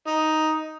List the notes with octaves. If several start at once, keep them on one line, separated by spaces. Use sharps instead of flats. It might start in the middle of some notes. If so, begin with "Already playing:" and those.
D#4